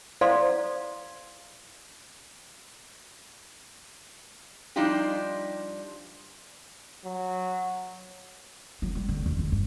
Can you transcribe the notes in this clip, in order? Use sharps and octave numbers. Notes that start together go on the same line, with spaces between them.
E4 A4 C5 D5 F5 C6
F3 G3 D4 D#4 F4 G4
F#3
F#3
G3
D3
E2
D3
G2